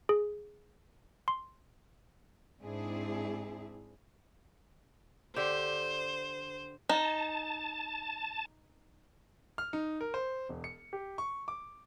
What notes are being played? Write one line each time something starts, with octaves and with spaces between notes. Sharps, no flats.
G#4
C6
G#2 C4 D4 E4 G#4
D3 G4 C5
D#4 A5
F6
D#4
A#4
C5
E1
C#7
G4
C#6
D6